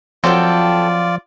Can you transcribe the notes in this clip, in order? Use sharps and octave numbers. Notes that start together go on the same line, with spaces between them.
F3 F#3 C4 F4 A4 D5 G5